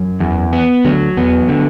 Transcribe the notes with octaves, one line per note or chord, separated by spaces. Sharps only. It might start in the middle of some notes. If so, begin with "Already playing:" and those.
Already playing: F#2 F#3
E2
B3
D2 D3 F#3
E2 B3
D3